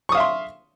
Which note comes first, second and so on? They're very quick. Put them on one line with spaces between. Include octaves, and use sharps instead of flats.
C#6 D#6 F5 E5 C6